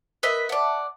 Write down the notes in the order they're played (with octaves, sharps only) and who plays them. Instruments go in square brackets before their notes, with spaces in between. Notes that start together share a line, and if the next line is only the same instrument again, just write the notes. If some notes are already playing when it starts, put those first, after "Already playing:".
[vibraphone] A#4 [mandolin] B4 D#5 E5
[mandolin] D5 F#5 [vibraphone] E5 A5